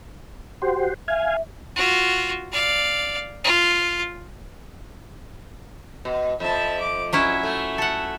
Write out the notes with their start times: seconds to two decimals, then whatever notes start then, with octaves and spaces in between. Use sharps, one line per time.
0.62 F#4 G4 C5
1.08 E5 F5 G#5
1.76 F4 F#4
2.52 D5 F5
3.44 F4
6.05 B2
6.40 F2 F3 E5 A5
6.80 D6
7.13 F#3 C#4 E4 E5
7.43 A3
7.78 A4 F#5